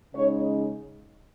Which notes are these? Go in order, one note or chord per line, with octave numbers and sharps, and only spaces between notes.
C#3 G#3 D#4 C#5